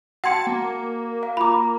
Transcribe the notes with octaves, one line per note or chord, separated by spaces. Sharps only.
F#4 F#5 G5 A5 C6 G#6 C#7
A#3
F5
F4 A#5 B5 D6